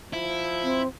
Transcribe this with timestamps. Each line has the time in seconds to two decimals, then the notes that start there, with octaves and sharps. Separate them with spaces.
0.13 F3 E4
0.63 C4